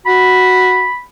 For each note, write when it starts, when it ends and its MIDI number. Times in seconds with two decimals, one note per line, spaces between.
0.06 0.88 66
0.06 1.01 83